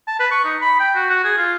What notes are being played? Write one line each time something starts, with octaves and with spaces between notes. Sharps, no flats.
A5
B4
C#6
D#4
B5
G5
F#4
F#4
G#4
F4